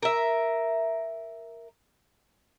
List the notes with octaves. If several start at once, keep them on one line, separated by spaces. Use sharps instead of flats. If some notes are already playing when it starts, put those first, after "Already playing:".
A#4 E5